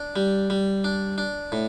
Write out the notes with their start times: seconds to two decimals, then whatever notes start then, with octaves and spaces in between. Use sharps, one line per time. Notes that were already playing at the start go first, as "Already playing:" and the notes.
Already playing: D4
0.16 G3
0.50 G3
0.84 D4
1.18 D4
1.52 A2